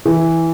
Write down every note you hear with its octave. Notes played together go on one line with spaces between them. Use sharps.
E3